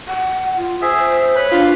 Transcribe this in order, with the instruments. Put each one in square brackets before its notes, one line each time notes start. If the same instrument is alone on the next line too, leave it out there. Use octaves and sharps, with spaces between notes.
[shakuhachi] F#5
F4
[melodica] G#4 E5 [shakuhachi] C5
[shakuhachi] C5
[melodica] B4 B5 [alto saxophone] C#5
[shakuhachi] D4 [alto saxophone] F4